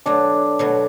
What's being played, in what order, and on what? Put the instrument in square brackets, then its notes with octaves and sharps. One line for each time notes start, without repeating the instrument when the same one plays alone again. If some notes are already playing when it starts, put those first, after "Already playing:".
[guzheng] B2 F#3 A3 [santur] D4
[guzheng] B2 F#3 A3